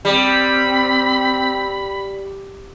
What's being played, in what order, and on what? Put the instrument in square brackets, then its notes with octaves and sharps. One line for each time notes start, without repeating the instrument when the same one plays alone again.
[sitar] G3 [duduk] C4 [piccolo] B5